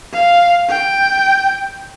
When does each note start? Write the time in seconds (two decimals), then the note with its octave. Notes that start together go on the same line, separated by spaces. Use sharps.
0.13 F5
0.69 G5